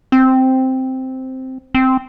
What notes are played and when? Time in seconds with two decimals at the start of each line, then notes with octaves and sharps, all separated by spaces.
0.12 C4
1.75 C4